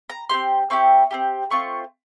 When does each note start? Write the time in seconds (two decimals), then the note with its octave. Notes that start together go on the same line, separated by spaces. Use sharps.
0.10 A#5
0.29 C4 D#4 G4 C6
0.70 C4 E4 G4 C#6
1.11 C4 E4 G4
1.50 A3 C4 F4 C#6